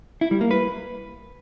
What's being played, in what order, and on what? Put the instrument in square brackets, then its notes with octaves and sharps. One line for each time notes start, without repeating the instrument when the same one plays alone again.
[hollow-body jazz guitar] E4
G3
A#3
B4